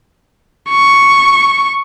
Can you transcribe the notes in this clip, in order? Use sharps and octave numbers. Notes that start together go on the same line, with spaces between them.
C#6